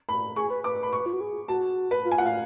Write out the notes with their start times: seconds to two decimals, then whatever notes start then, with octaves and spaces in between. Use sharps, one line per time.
0.09 B5
0.36 G#4 C#6
0.50 B4
0.64 B4 D6
0.83 B5
0.93 C#6
1.06 F4
1.13 F#4
1.21 G#4
1.48 F#4 A5
1.91 B4
2.05 F4
2.12 G#5
2.18 F4 F#5
2.26 F5